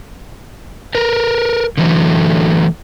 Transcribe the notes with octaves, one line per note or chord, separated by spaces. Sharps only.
A#4 B4
D3 E3 F#3 A3